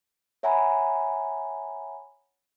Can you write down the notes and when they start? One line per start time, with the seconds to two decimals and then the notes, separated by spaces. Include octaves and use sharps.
0.43 C#5 E5 F#5 G#5 A#5 B5